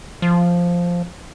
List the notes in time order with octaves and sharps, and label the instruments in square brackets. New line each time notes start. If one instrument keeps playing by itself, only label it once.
[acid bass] F3